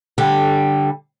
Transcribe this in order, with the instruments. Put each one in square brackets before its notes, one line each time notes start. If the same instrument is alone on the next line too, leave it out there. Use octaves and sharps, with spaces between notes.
[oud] D3 G3